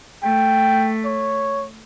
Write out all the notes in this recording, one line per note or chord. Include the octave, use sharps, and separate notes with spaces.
A3 G5
C#5